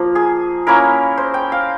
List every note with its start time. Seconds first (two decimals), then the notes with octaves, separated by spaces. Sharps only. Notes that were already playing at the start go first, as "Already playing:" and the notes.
Already playing: F3 A#3 A#4
0.15 G#4
0.67 A#3 C#4 E4 A#4
1.17 C5
1.34 G5
1.52 F5